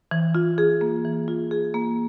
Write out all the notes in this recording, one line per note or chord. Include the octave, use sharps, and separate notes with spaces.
E3
F4
G#4
A#3
E3
F4
G#4
A#3